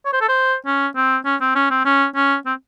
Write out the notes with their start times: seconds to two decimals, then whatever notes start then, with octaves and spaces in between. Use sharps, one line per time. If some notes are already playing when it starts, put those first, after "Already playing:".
0.05 C#5
0.13 C5
0.21 A4
0.29 C5
0.66 C#4
0.96 C4
1.25 C#4
1.41 C4
1.56 C#4
1.71 C4
1.85 C#4
2.15 C#4
2.46 C4